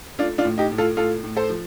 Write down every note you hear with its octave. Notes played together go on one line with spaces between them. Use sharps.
A3 D4 F4
D4 F4
A2
D#4 G4
A2
F4 A4
A2 F4 A4
A2
A4 C5
F3